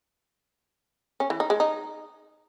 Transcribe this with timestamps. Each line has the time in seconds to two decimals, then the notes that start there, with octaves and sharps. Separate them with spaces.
1.20 C#4
1.30 E3
1.40 D#4
1.50 G#3
1.60 D#4